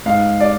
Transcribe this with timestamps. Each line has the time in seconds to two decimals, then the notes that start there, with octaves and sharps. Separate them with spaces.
0.06 G#2 F5
0.40 D5